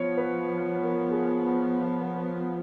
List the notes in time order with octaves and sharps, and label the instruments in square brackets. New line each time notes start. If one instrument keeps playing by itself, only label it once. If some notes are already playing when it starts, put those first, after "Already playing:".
Already playing: [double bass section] F3 B3 [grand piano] C#5
[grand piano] B4
A#4
G#4